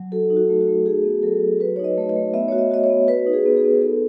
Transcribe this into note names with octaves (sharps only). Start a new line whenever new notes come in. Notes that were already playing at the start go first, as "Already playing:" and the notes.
Already playing: F#3
F#4 A4
D#4
F#4
A3
F#4
A3
F#4 G#4
B3
F#3 A4
F#3
F#4 B4
C#5
D#4
D#5
A3
D#5
A3
B3 E5
F#4 C#5
D#5
F#4 D#5
C#5
B3
F#4 B4
D#4
G#4
B3
G#4
B3
B3 A4